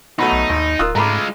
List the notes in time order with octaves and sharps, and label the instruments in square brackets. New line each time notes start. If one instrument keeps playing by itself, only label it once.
[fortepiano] B2 F#3 A3 [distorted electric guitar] D#4 [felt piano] B5
[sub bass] B1
[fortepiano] G#1 [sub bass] D#2
[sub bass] D1 [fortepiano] F4 D#6 [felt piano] A#4 E6 F#6
[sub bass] G#2 [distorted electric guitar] G#3 F4 [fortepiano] A3 [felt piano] A#5 B5 D6